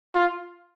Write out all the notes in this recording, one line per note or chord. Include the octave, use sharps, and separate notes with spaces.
F4